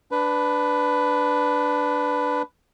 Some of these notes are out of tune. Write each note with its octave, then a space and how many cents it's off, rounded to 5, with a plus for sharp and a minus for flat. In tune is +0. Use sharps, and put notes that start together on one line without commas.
D4 +0 B4 +10